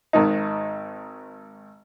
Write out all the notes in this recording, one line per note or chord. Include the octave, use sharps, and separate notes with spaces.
G#1 G#2 D#3 D#4